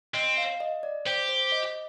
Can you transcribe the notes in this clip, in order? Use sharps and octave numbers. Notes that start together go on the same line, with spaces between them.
C4 D#5
F5
D#5
D5
G4 C5
C5
D#5